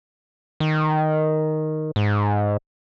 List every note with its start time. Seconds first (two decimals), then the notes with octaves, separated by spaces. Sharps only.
0.60 D#3
1.96 G#2